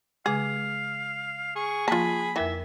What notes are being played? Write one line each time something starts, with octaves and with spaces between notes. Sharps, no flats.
C#3 G#3 G#4 F5
G#4 C#6
F3 A#3 F4 A5 B5
F2 E3 A#4 E5 G5